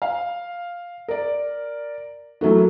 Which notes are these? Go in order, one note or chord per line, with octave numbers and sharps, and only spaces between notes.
F5
A#4 D5
E3 F#3 A3 A#3 F#4